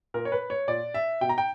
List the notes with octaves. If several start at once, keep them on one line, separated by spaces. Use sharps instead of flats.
A#2 A#4
C#5
B4
C#5
A#2 D5
E5
B2 G5
A#5
G5